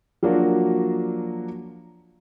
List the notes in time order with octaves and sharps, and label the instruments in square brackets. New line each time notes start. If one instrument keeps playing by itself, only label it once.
[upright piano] F3 F#3 A#3 D4 F#4